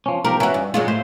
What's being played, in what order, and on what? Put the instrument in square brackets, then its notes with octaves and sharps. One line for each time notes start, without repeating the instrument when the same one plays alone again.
[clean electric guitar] F3 C#4
[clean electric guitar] B1 F3 G4 [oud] A#4
[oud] E3 F#4 [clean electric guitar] C#4
[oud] G2
[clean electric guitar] G2 A#2 [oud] F#3 G#3 F4
[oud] A2 [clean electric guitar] C5